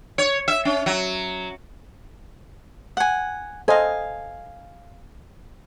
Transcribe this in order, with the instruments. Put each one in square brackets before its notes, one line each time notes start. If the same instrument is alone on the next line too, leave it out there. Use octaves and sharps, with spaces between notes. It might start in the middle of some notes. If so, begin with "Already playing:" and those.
[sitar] C#5
E5
C#4
F#3
[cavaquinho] F#5 G#5
[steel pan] A4 C5 D#5 [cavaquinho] F5 G#5